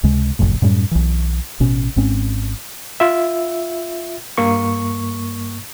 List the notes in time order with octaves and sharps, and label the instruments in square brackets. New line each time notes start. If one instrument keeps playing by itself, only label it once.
[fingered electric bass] C#2 C3 G#3
F#1 C2 F2 A2
F#2 A2 G3 C#4
B1 E3
A1 B2 C#4
G#1 G#2 C4 C#4
[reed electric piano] F4 E5
G2 A#3 C#6